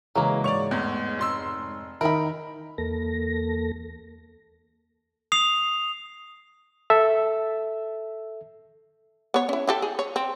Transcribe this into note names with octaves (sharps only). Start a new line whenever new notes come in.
C#3 E3 F#3 G#3 A#3
G#2 C#5 D5 C#6 F7
E2 A2 G#3
F1 C6 E6
D#3 D#4 E4 A#4 B5
E2 A#3 A4 A#6
D#6 C7 F7
A4 E5
B3 C#5
C#4 E4
E4 G4 A4
G#4
C#5
C4